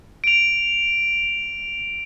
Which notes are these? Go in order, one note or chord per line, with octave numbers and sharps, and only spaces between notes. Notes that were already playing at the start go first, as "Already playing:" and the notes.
D7 F7